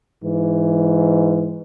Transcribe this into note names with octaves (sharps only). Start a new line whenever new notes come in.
G#2 E3